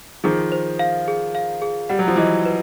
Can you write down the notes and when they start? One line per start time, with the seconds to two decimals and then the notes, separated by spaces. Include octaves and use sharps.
0.24 D#3 F3 G#4
0.52 C5
0.79 F5
1.08 G#4
1.35 F5
1.62 G#4
1.89 G3 F#5
1.99 F#3
2.08 F3
2.16 E3 F#3 D#5
2.45 B4